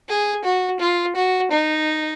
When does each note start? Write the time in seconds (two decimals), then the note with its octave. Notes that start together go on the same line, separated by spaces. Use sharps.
0.09 G#4
0.44 F#4
0.80 F4
1.15 F#4
1.51 D#4